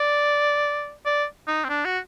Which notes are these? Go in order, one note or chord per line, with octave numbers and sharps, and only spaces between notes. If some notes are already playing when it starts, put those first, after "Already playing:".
Already playing: D5
D5
D#4
C4
D4
F#4